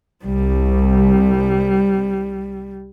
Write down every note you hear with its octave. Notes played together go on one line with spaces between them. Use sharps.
C2 G3